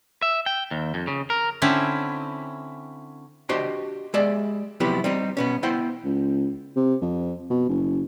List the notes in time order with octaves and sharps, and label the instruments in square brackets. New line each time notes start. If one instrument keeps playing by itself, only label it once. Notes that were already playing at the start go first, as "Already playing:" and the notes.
[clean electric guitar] E5
G5
D#2
F2
C#3
A#4
[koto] D3 C4 C#4 E4
[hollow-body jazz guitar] D4 F#4 G4 C5 D#5
G#3 G4 D5 E5
C3 F3 F#3 B3 E4 G4
G3 C4 D#4
B2 B3 C#4
B3 E4 C5 F#5 G5
[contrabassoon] C#2
C3
F2
B2
F#1